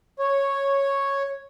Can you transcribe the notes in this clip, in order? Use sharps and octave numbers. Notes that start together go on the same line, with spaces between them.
C#5